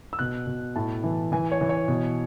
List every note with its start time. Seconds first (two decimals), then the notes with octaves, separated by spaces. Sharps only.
0.13 E6
0.19 B2 F#6
0.47 B2
0.76 A2 A5
1.04 E3
1.32 E3 G#5
1.52 C#5
1.61 E3
1.69 C#5
1.88 B2